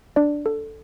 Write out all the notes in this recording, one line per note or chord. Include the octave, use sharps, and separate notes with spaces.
D4 D5
A4